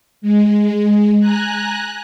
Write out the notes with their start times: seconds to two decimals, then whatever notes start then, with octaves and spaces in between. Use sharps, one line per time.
0.22 G#3
1.20 G#5 A#5 F#6